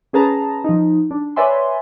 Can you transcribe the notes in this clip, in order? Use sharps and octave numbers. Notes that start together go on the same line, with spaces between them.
C#4 G#4 B4 A5 A#5
F3 D#4
D4
B4 C#5 D5 E5 G#5 C6